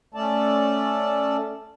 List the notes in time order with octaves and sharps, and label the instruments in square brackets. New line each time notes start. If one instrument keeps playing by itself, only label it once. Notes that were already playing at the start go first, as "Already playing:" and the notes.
[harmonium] A3 C#4 A4 D5 A5